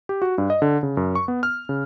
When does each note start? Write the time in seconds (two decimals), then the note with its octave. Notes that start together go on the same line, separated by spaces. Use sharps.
0.09 G4
0.22 F#4
0.38 G2
0.50 D#5
0.62 D3
0.83 C#3
0.97 F#2
1.15 C#6
1.28 B3
1.43 F6
1.69 C#3